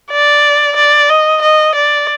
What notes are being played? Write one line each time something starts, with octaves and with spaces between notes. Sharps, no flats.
D5
D5
D#5
D#5
D5